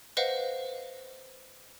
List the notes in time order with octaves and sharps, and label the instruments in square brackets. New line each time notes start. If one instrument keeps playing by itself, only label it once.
[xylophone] B4 C5 D#5 F5 F#5